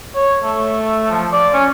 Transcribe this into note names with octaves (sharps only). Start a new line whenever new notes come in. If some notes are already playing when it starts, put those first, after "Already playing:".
C#5
A3
F3
D5
C#4